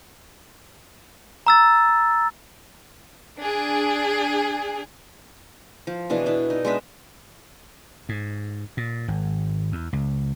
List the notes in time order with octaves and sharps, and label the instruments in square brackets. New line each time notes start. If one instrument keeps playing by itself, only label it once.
[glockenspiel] A#5 E6 A6
[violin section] D4 G#4
[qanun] F3
B2 E3 D4 G#4
D4 E4
D#4
G#3 B3 D4 E5
[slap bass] G#2
A#2
G#1
E2
C#2